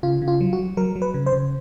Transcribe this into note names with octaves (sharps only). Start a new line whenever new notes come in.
C#3 F4
C#3
F4
F#3
F#4
F#3
F#3 A#4
F#3
B4
C#3
C5
C#3